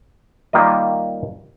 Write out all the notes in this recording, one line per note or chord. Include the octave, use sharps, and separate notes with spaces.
D#3 G3 A#3 F4 D#5